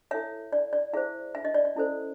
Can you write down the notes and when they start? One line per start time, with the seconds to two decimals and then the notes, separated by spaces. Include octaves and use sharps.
0.11 E4 A4 C#5 E5
0.52 D5
0.73 D5
0.93 E4 G#4 C5 E5
1.35 E5
1.45 D#5
1.54 D5
1.65 D5
1.75 C#4 E4 A4 C5